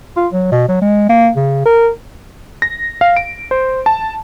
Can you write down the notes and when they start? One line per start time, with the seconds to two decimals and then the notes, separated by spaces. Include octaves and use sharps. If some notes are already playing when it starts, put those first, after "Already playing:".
0.17 F4
0.33 F#3
0.52 B2
0.68 F#3
0.82 G#3
1.09 A#3
1.36 C#3
1.66 A#4
2.62 A#6
3.01 F5
3.16 D7
3.51 C5
3.86 A5